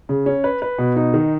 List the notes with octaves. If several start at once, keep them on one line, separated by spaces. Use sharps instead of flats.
C#3
C#4
B4
B4
B2
D#4
D#3